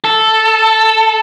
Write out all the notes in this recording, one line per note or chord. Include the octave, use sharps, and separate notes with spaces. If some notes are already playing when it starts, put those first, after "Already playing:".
A4